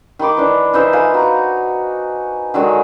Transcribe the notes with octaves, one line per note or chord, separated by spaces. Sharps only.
D#3 B5 C6 D6
E3 D4
E3 D#4 C5 E5
F4 B4 F5 G#5
F#4 A#5
D3 D#3 F#3 G#3